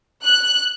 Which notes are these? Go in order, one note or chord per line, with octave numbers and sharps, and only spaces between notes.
F#6